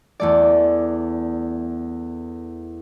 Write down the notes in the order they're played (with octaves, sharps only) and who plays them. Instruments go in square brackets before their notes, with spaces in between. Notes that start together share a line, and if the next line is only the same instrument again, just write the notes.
[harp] E2 A3 D5